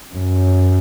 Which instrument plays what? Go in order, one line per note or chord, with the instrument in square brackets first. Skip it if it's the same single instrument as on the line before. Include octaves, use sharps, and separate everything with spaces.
[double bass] F#2